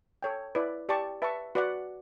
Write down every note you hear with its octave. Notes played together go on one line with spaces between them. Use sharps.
A4 C#5 G5
E4 B4 D5
G4 D5 A5 C#6
B4 E5 A5 C#6
F#4 B4 D5 F#5